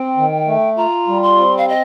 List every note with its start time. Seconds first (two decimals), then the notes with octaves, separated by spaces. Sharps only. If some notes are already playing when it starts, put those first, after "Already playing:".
Already playing: C4 G5
0.17 D#3
0.47 A3
0.77 F4 A#5
1.08 G3
1.23 C6
1.38 C4
1.57 F5
1.69 D#5